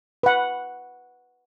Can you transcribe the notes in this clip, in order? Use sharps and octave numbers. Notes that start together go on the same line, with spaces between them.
B4 F#5